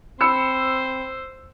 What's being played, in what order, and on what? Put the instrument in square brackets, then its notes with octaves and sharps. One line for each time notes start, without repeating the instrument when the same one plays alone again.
[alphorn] C4 [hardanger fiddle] C5 [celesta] B5 [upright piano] E6 C#7